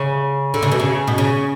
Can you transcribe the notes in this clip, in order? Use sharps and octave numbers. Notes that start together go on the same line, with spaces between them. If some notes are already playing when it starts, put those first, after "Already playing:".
Already playing: C#3
D3
C#3
B2
C#3
B2
C#3